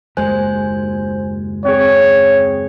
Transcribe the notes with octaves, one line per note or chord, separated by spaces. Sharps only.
F#1 D#2 G#3 C5 G#5 F#6
C4 G#4 C#5